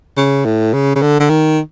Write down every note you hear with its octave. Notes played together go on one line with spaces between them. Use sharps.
C#3
A2
C#3
C#3
D3
D3
D#3